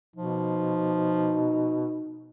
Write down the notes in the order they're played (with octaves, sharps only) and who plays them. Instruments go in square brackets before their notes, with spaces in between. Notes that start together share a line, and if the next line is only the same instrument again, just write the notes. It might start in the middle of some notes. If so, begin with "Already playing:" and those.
[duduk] B2 [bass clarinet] F3 [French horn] D#4